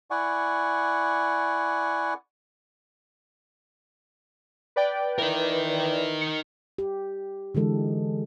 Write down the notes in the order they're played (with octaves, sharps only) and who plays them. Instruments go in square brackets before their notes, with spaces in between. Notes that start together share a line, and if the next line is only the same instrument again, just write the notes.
[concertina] E4 D5 F#5 G#5 C#6
[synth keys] B4 D5 G5
[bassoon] E3 [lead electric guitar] D#4 A#4
[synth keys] C#7
[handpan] G4
D3 E3 G#3 A4